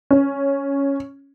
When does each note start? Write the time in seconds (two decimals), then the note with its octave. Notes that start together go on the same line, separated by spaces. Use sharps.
0.11 C#4